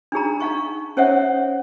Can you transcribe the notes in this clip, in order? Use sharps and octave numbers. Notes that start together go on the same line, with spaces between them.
D4 D#4 G#4 A#5
D#4 F5 C#6
C#4 C5 C#5 E5 F#5